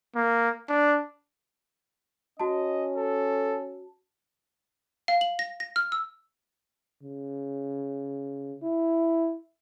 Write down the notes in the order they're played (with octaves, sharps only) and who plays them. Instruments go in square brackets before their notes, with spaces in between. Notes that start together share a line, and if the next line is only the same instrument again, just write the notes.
[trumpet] A#3
D4
[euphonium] C#4 [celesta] F#4 A5 [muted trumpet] D#5
[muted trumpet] A4
[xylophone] F5
F#7
A#6
A#6
F6
E6
[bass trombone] C#3
E4